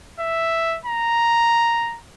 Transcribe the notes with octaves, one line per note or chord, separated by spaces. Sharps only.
E5
A#5